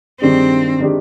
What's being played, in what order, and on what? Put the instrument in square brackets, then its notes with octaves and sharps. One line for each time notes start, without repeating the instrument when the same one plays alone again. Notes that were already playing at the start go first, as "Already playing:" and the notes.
[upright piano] G2 D#3 G#3 D4 G4 [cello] C4
[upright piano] D#3 G#3 D4 G4